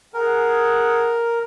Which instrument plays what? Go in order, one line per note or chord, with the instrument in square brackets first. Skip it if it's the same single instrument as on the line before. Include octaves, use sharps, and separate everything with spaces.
[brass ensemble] G#4 F#5 [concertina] A#4